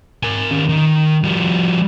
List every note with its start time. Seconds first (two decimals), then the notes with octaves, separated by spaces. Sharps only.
0.23 A#4 G#5
0.51 D#3 C#4
0.69 D#3
1.24 F3 G3